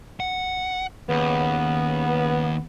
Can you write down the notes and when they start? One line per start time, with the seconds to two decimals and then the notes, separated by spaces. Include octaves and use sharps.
0.20 F#5
1.09 D#2 C#3 B3